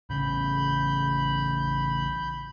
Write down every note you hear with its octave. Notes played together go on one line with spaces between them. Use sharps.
A1 C#3 B5 G6